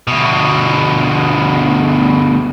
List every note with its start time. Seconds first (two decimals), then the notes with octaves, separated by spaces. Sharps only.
0.07 D2 B2